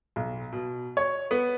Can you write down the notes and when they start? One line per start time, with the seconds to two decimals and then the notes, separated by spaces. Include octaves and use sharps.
0.16 B1
0.53 B2
0.97 C#5
1.31 B3